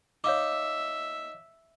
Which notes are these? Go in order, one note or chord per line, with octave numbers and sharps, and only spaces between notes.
D#4 C#5 E5 F5 D6